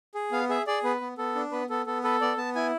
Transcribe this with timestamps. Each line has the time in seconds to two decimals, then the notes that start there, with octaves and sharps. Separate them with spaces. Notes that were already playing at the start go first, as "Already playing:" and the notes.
0.15 G#4
0.32 B3 F5
0.49 G#4 E5
0.67 G#4 D5
0.84 B3 B4
1.01 B3
1.18 B3 A4
1.35 D4
1.52 B3 B4
1.70 B3 A4
1.86 B3 A4
2.04 A4 B4
2.21 B3 D5
2.37 B3 A5
2.55 E4 G#5